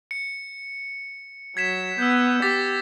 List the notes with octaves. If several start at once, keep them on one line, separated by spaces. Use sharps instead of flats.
C#7
F#3 G#6 B6 E7
B3 E6 G6
G4 D6 A6 B6